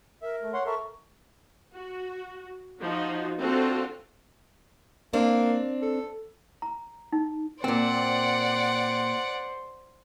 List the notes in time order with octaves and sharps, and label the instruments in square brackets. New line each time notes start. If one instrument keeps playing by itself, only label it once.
[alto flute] A#4 [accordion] E5
[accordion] A3
C#5 F#5 C6
[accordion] A4 A#4 E5 [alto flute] C#6
[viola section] F#4
F3 D#4 F#4
C4 D4 F4 F#4 A4
[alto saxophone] A#3 [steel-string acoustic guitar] C4 D4
[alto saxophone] A4
[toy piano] A#5
D#4
[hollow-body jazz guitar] A#2 C4 [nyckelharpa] C5 [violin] D5 F#5